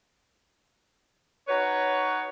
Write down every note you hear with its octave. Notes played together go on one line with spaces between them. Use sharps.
D#4 F#4 B4 C#5